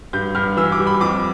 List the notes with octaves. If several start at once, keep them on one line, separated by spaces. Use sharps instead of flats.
G2 G6
G2 F6
E3 E6
D6
G3
B5
F2 D6